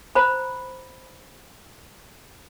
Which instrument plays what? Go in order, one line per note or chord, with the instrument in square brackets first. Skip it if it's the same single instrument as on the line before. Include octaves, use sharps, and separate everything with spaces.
[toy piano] C5 A#5 B5